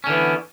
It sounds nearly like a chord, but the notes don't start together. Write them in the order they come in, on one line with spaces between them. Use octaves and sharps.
C#4 D3 E3 B3